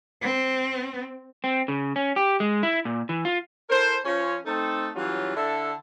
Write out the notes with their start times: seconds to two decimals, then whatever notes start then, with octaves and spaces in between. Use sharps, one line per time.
0.22 C4
1.44 C4
1.68 C#3
1.96 C#4
2.16 G4
2.40 G#3
2.63 E4
2.85 A#2
3.09 E3
3.25 F4
3.70 E4 A4 A#4 C5
4.05 F3 C#4
4.46 A3 C4 D#4 A4
4.95 E3 F#3 G3 C#4 F4
5.36 D3 D4 E4 A4